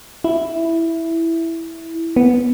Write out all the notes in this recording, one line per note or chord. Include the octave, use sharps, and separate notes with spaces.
E4
B3